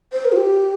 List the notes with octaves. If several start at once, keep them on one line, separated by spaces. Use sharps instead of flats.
C5
A#4
F4
G4